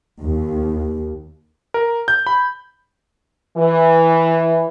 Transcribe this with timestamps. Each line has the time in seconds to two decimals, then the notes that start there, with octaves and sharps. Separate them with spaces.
0.23 D#2
1.74 A#4
2.08 G6
2.27 B5
3.57 E3